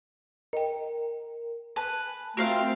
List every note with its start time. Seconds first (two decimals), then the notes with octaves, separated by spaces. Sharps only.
0.53 A#4 D#5 G5
1.76 B4 G#5 A5
2.37 A3 C4 F4 F#4 A#4 C5 F5